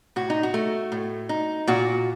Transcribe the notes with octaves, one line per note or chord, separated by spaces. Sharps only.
A2 F#4
D#4
F#4
A3
A2
D#4
A#2 F#4